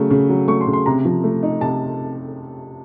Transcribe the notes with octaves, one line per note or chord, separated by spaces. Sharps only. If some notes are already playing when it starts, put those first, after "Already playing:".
Already playing: C#3 F#3 A3
C#3
F#3
A3 C#6
C6
C#3
C6
C3 A#5
F3
A3
D#4
C3 A5